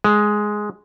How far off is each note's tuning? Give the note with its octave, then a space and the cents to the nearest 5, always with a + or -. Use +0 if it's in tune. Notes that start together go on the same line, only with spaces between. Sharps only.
G#3 +5